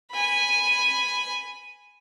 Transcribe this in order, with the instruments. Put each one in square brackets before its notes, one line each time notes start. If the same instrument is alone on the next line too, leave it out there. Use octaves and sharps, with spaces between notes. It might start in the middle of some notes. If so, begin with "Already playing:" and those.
[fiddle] G#5 B5